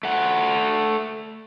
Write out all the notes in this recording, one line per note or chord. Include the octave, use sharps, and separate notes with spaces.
A3 F#5